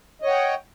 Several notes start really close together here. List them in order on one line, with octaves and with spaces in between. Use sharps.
D#5 C#5 F#5 G5